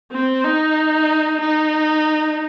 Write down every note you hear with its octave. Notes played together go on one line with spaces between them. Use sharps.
C4
D#4
D#4